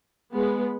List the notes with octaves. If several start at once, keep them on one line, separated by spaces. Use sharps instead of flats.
G#3 B3